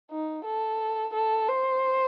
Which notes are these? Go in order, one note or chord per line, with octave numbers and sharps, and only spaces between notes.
D#4
A4
A4
C5